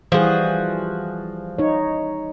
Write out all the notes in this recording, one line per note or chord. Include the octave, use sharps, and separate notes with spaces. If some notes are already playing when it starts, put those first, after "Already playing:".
E3 F3 G3 F#4 G#4
D#4 C#5